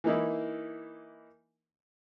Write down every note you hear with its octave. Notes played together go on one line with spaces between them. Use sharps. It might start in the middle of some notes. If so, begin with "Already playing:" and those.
E3 A#3 D#4 E4